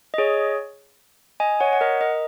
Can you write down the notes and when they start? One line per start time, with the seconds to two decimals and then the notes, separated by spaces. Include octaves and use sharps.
0.14 D#5
0.18 G#4 C#5
1.40 D#5 G#5
1.60 C#5 F#5
1.73 F#5
1.81 A#4 D#5
2.01 A#4 D#5